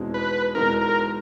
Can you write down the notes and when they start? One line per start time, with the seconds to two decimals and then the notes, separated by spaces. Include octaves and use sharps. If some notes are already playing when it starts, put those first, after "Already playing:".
Already playing: E2 B2 G#3 C4 D#4
0.14 B4
0.55 E2 B2 G#3 C4 D#4 A#4
0.81 A#4